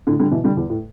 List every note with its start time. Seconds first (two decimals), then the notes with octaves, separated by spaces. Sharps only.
0.07 A2 D3
0.19 D3 G3
0.31 B2 E3
0.44 D3 G3
0.57 E2
0.69 A2